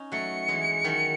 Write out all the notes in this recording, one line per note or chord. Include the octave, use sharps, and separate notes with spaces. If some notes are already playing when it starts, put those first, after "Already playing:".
Already playing: C#4 D#4
F#3 A3 C#7
E3 G#3
D#3 F#3